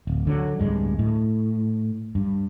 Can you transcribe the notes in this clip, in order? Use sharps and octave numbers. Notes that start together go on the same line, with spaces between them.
D1
D3 F#3
D1 G2 G#3
A2
G2